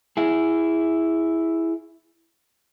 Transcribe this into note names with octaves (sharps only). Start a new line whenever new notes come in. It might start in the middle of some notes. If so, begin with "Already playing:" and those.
E4 G#4